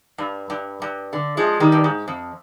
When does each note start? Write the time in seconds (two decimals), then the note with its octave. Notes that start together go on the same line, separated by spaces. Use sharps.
0.18 G2
0.50 G2
0.82 G2
1.13 D3
1.37 F3 G#3
1.60 D#3 G3
1.72 G2
1.84 G#2
2.08 F2